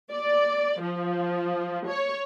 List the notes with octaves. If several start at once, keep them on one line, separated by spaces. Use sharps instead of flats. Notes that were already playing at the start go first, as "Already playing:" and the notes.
D5
F3
C#5